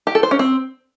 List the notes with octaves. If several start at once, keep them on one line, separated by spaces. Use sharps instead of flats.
G4
A4
C5
C#4
C4